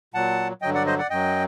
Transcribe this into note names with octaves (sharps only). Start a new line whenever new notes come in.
A#2 F#3 F#5 A5
G2 D3 F#3 D#5 G5
D5 F#5
C5 D#5
D5 F#5
F#2 F#3 D#5 G5